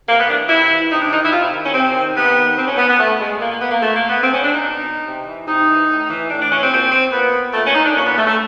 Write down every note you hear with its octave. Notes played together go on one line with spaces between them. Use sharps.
C3 A#3
B3
E3 D4
C3 E4
E3
C3 D#4
D4
D#3 D#4
E4
C3 F4
E4
D#3
C#4
C3 C4
D#3
C3 B3
D#3
B2 C4
C#4
B3
B3
B2 A3
G#3
A#2 A#3
A#3
B3
A#3
A#2 A3
A#3
B3
B2 C4
C#4
D4
D#4
B2
C3
E3
C3 D#4
E3
A2
E3
A2 D4
D4
E3 C#4
C4
A#2 C4
C4
A#2 B3
A#2 A3
C#4
D#4
D4
A#2 C#4
B3
A3
A3